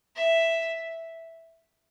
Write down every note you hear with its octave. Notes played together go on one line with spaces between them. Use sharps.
E5